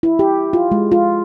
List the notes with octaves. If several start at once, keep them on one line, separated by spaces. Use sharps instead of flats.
E4
G4
F4
G#3
F4